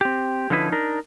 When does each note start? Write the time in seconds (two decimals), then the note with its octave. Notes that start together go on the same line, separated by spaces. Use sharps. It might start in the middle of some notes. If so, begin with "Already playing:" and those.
0.01 C4 G4
0.50 D3 F3 C#4 D#4 E4 B4
0.72 D4 D#4 A#4